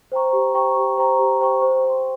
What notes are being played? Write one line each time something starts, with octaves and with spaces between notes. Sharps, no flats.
C5 G5 A#5 C#6
G4
C5 G5 A#5 C#6
G4
C5 G5 A#5 C#6
G4
C5 G5 A#5 C#6
C5
G5 C6